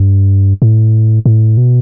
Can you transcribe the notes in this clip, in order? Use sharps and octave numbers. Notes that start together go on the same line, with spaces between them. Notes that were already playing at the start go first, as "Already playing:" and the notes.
Already playing: G2
A2
A2
B2